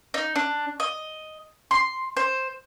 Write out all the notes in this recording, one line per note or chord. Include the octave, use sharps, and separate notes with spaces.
D#4
D4
D#5
C6
C5